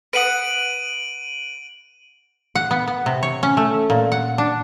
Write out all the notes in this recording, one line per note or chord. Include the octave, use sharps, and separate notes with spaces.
B4 F#5 D#6 D7 D#7 F#7
F#5
B3
B3
C3
C#5
C#4
A3
A#2
F#5
D4